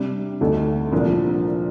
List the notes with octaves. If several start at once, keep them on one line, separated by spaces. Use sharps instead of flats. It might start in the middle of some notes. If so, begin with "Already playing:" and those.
Already playing: C3 G3 D4
D2 D3 A3 D#4 A4
C2 A#2 F3 A#3 D4